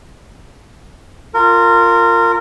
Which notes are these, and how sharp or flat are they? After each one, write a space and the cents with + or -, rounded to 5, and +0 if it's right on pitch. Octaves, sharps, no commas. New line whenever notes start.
F4 +0 A#4 -25